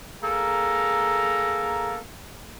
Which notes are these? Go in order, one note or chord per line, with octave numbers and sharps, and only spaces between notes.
A#3 G#4 A4 A#5